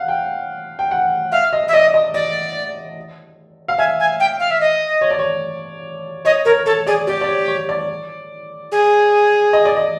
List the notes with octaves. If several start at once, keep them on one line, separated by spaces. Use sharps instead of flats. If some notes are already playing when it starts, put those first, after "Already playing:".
Already playing: F5 F#5
G5
G5
F#5
E5 F5
D#5
E5
D5 D#5
D#5
D5 D#5
F5
E5 G#5
G#5
G5
F5
E5
D#5
C#5
D5
C#5
C#5 D#5
A#4 C#5
A4 C#5
G#4 D5
G4 D5
D5
C#5
C#5
D5
G#4
D#5
D5
D#5